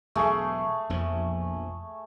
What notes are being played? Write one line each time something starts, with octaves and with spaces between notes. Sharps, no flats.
E1 B1 B2 A3 G#4
E1 A#1 F2 F3